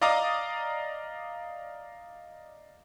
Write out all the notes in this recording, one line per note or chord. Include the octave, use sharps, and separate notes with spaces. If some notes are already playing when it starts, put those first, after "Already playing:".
D5 D#5 F5 A#5 D6 D#6